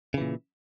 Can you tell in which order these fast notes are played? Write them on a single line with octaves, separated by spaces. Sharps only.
C#3 E3 A#2